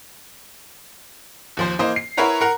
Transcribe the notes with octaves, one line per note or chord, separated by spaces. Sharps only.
D#2 F3 C5
E3 A#3 C5 D#5
C7
E4 A#4 B4 C#5 F#5 A#5
A#4 F#5 A#5